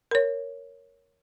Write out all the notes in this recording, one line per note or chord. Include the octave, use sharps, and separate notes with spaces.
A#4 C#5